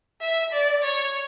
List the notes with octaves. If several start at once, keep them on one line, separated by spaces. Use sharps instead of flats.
E5
D5
C#5